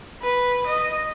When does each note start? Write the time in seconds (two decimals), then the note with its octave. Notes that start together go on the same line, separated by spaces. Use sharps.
0.22 B4
0.67 D#5